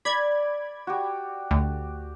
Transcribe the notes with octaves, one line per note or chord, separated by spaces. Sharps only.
D5 B5 G#6
F#4 G4
D2